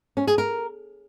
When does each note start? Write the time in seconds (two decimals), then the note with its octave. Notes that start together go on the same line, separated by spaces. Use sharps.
0.17 C#4
0.27 G#4
0.38 A#4